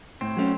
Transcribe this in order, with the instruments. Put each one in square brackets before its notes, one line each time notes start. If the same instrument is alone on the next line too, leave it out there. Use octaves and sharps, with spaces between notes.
[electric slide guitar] A2 [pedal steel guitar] C4
[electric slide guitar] F#3 A3 C#4